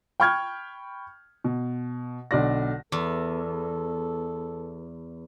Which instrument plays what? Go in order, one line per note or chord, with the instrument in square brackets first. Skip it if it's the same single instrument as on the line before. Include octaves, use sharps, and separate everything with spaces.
[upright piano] G5 B5 C#6 F6 G6 G#6
B2
B1 D3 D5 A#6
[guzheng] E2 [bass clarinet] A4